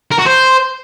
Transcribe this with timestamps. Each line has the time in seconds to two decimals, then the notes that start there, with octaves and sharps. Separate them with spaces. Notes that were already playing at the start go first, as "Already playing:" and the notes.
0.12 A#4
0.19 F#4
0.26 C5